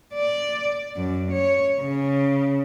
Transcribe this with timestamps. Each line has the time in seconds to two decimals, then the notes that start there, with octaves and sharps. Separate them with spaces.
0.14 D5
0.96 F#2
1.32 C#5
1.80 C#3